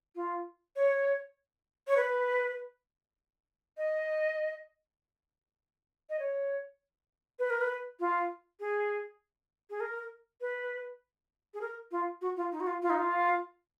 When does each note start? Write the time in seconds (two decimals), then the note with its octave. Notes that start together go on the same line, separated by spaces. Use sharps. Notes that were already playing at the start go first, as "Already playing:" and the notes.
0.16 F4
0.76 C#5
1.88 C#5
1.97 B4
3.77 D#5
6.10 D#5
6.19 C#5
7.39 B4
7.50 A#4
7.61 B4
8.00 F4
8.60 G#4
9.70 G#4
9.80 A#4
10.41 B4
11.54 G#4
11.61 A#4
11.91 F4
12.21 F#4
12.37 F4
12.52 D#4
12.60 F#4
12.67 F4
12.82 F4
12.90 D#4
12.99 F4